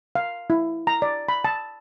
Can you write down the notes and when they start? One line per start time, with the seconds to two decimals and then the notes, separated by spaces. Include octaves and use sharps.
0.15 F5
0.50 E4
0.87 A#5
1.02 D5
1.29 B5
1.45 A5